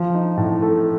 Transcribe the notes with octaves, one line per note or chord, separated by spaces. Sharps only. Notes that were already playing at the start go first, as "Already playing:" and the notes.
Already playing: F3
D#4
A2
A3